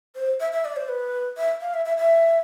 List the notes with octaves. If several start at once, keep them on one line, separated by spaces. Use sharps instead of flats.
C5
E5
E5
D5
C5
B4
E5
F5
E5
E5
E5